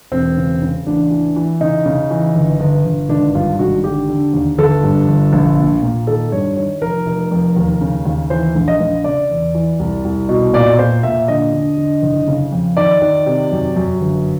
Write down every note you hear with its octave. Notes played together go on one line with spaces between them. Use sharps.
E1 C4
C#3
C#3
A1 D4
E3
E3
C#3 D#4
C#3
E3
G1
G1
G1
G#1 D4
G2 F4
G#1 F#4
D3 G4
D3
D#2
G1 A4
G2
G1
A#1
A#2
A#2
D#3 A4
G2 C#5
D#3 C#5
F1 A#4
F1
F2
D#2
C#3
D#2
E3 C5
A#1
D#5
A#1
C#3 D5
E2
E3
C2
C2
B2
A#2 D5
A#2 C5
A#2 E5
D3 D#5
D3
D3
F#1
C#3
F2
D#3 D5
D#3
C3
F#2
F#2
G1